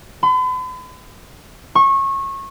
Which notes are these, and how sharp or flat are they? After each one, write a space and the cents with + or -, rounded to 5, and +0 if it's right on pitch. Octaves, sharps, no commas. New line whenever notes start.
B5 +45
C#6 -25